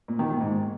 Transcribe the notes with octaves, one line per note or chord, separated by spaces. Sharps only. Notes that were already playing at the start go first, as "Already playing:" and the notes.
A#2
D#3
A#2
G#2